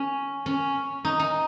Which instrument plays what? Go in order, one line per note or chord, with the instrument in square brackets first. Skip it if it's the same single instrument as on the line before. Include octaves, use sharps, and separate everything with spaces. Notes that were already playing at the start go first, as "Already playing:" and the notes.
Already playing: [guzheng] C#4
C#4
D#4
D#4